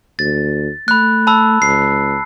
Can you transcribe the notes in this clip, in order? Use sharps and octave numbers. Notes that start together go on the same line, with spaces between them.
D2 A6
A3 B5 F#6
A5 B5 E6
C#2 C7